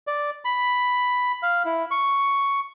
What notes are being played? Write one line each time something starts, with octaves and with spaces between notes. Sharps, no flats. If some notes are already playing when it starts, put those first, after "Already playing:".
D5
B5
F5
E4
C#6